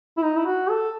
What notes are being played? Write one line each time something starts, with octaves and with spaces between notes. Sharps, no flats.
E4
D#4
E4
F#4
A4